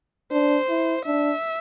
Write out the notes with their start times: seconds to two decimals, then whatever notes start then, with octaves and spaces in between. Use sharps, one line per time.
0.31 D4 C5
0.69 E4
1.06 D4 E5